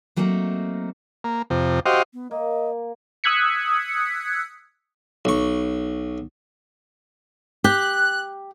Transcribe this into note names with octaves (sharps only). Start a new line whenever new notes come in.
F#3 A3 A#3 C4 D#4 A#4
A#3
F2 C3
F#4 G4 C5 D#5 F5
B3
A#3 D#5
D#6 E6 F#6 G#6 B6 C#7
B1 C#6
G4 F#6